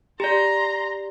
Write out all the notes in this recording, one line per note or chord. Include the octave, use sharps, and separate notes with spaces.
G4 D5 A#5 C6